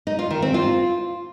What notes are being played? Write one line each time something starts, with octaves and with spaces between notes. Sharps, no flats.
D#4
F4
D#3
C4
F4